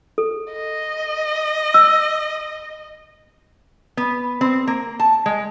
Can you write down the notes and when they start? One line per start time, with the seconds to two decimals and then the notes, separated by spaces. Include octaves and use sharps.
0.18 A4
0.53 D#5
1.74 E6
3.97 B3
4.41 C4
4.67 A#3
5.00 A5
5.26 G#3